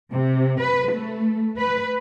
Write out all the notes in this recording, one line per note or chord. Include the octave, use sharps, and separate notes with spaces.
C3
B4
A3
B4